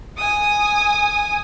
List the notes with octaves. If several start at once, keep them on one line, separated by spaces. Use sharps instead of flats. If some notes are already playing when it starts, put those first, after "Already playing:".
G#5 D#6